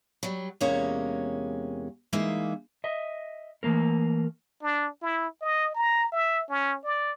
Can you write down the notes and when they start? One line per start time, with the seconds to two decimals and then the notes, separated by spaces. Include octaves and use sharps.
0.23 F#3 G3
0.61 E2 C3 G#3 A#3 C#4 C#5
2.13 E3 G#3 A#3 D#4 E5
2.84 D#5 E5
3.63 E3 A3 A#3 A#4
4.63 D4
5.02 E4
5.42 D#5
5.75 A#5
6.12 E5
6.49 C#4
6.84 D5